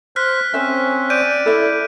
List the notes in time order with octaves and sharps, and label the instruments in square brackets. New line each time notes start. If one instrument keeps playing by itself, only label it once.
[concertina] C5 [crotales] F6 F#6 B6
[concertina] C4 C#4 [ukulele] C5 E5
[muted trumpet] D5 [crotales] G6 D7 D#7
[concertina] E4 [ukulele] A4 E5